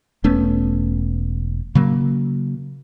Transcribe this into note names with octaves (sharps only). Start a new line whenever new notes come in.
E1 A3 B3 C#4
C#3 F#3 A#3